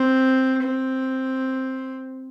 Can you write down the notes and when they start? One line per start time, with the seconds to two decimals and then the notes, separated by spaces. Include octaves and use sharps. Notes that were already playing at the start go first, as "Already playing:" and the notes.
Already playing: C4
0.62 C4